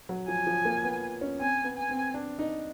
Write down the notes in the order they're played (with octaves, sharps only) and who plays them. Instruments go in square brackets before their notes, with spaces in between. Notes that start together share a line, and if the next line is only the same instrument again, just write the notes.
[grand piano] F#3
[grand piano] F3 [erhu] G#5
[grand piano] F3
A#3
B3
C#4
[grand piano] C4 [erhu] G#5
[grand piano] B3
[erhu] G#5
[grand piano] C4
D4
D#4